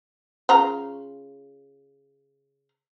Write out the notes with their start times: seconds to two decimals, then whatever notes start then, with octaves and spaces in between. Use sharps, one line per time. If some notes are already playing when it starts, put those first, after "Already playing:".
0.49 C#3 F4 A#5